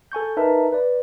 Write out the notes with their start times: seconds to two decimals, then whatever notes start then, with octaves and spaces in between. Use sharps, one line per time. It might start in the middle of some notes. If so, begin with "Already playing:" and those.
0.12 A4 G#5 C#6 G6
0.37 D#4 A#4 B4 E5 A5 A#5
0.73 B4 D5